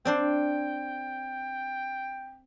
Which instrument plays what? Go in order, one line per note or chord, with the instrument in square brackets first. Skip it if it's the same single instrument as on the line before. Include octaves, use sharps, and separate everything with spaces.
[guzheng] C4 D4 C5 [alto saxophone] G5